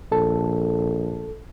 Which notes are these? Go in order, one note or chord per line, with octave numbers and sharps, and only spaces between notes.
A#1 A4